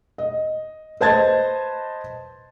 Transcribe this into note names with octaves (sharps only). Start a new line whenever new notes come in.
D#5
B4 C5 D#5 A5 G#6 A6